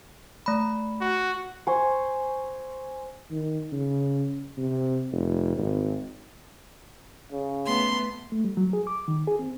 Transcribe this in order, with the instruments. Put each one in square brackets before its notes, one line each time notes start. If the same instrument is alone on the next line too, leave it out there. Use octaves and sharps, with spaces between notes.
[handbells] A3 B5
[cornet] F#4
[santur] C5 G#5 C#6
[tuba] D#3
C#3
C3
F1
G#1
[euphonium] C#3
[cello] A3 B3 [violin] C6
[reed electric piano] A3
G3
F#3
G#4
D6
D#3
G#4
C4